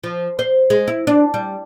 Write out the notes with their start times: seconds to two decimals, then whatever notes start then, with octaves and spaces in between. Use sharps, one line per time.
0.04 F3
0.39 C5
0.70 G#3
0.88 E4
1.07 D4
1.34 G3